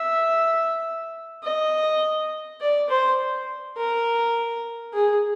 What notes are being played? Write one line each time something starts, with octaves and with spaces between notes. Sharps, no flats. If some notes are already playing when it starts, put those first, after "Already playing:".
Already playing: E5
D#5
D5
C5
A#4
G#4